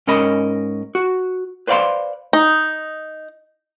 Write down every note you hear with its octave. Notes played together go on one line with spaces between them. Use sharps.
G#2 C#4 A#4 D#5 B5
F#4
B4 C5 D5 F5 B5 C6
D#4